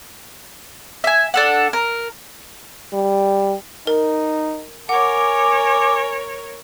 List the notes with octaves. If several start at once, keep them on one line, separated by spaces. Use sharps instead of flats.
E5 G#5
D4 A4 F#5
A#4
G3
D#4 A#4
A#4 C#5 F#5 G#5 D6